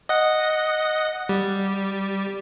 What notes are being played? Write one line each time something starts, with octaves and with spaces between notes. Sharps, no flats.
D#5 F#5
G3